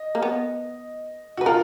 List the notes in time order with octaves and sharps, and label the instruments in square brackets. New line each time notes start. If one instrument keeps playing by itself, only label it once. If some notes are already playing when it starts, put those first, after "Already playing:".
Already playing: [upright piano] D#5
[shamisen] A#3
B3
[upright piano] F#4
[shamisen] B4
[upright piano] F4 [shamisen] A#4